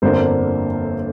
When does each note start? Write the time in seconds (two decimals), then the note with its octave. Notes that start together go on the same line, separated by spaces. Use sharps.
0.02 G1 F2 D3 A#3 D4 C5